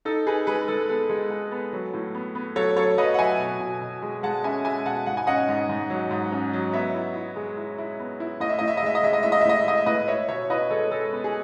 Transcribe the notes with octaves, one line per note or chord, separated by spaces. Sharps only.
D#4 A4
D#4 G#4 B4
G#3 G#4 B4
G#3 A4
B3 A4
G#3
G#3
B3
F#3
A2
B3
B3
F#3 A4 C#5
F#3 A4 C#5
F#3 B4 D#5
F#5
F#3 E5 G#5
B2
B2
B2
G#3
G#3 F#5 A5
C#4 E5 G#5
G#3 E5 G#5
B2 F#5 A5
G#2 F#5
G#5
C#4 D#5 F#5
G#2
G#2
F#3
G#2
C#4
F#3
B3 C#5 E5
E4
E4
G#3
E4
E4
B3
E4
A2 D#5
E5
A2 D#5
E5
D#5
G#3 E5
D#5
G#3 E5
D#5
A2 E5
D#5
E5
A2 D#5
E5
A2 D#5
E5
A2 B4 D#5
E4 C#5 E5
B2 C#5 E5
E4 B4 D#5
G#3 A4 C#5
G#3 A4
B3
G#4